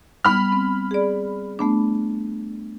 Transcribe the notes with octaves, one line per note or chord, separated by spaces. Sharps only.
G3 B3 B5 F6
C4
G#4 D5
A3 B3 D4